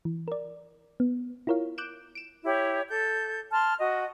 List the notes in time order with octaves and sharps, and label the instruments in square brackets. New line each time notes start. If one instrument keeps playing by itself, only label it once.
[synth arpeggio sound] E3
A#4 D5
B3
E4 F4 A#4 C#5 F5
D6 F#6 G6 D7 E7
D7 E7
[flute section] E4 G4 C#5
A4 G6
A5 C6 F6
F#4 D#5